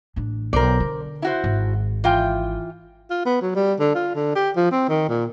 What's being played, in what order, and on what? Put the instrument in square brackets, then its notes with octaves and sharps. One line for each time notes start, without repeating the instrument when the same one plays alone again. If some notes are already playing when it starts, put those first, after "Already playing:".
[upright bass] A1 D4
[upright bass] B1 [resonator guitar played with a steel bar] A#4 C5 D5
[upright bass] D3
[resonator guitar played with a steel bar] E4 F#4 C5
[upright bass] G#1
[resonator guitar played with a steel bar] E3 F4 G5
[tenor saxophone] F4
B3
F#3
G3
D3
F4
D3
G4
F3
C4
D#3
A#2